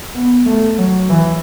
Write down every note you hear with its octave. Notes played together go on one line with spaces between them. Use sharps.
B3
A3
F#3
E3